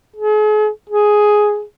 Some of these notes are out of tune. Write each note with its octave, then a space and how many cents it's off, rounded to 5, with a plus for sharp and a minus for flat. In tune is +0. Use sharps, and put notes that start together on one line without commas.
G#4 +40
G#4 +5